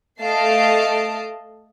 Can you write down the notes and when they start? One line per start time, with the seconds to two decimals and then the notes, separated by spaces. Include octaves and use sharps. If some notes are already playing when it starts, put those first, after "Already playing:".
0.23 A3 D#5 F5 A5 C7 D7